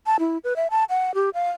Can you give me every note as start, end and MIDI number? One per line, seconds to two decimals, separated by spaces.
0.06 0.16 81
0.20 0.38 64
0.44 0.56 71
0.56 0.67 76
0.71 0.84 81
0.90 1.14 78
1.14 1.30 67
1.34 1.50 77